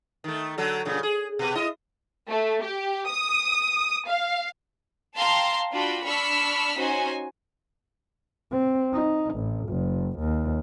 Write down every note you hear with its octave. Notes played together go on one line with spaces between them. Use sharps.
D#3 A3
D3 F#3 A4
F#2 A#2 C#3
G#4
B2 B4
E4 D#5
A3
G4
D#6
F5
F5 G5 A5 A#5 C6
D4 F4 F#4 G5 B5
D4 B5 C#6 E6 F6 B6
C#4 D#4 F#4 C5 G#5
C4
D#4
A1
F#1
D#2